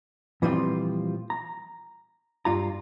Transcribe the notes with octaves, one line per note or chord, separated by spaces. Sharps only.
A#2 E3 F3 G3 C4 F4
A#5
G2 F4 A#5